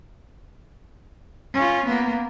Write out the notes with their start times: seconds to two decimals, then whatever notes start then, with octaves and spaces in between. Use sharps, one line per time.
1.54 C#4 F4
1.86 A#3 B3